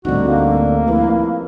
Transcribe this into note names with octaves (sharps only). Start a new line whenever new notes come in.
D2 A2 D3 G3 C4 D#4 F#4
A#3
F3 E4 A#4 B4